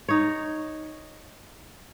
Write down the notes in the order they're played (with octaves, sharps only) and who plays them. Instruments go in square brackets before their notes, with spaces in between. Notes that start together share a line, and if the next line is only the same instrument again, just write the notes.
[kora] D#4 C#5